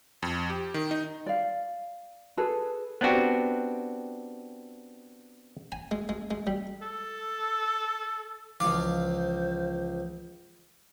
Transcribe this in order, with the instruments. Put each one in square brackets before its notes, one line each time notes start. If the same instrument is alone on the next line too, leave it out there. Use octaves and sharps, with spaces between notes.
[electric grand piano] F2
G4
D#3
D#4
[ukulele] D5 F5
G#4 A4 B4
[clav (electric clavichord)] B3 C4 D4 F#4 G4
[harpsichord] G#5
G#3
G#3
G#3
G3
[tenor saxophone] A4
[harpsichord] C#2 F5 [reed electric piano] E3 F3 [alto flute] C5 [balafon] D6